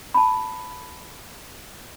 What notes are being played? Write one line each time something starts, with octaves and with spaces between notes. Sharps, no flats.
A5 B5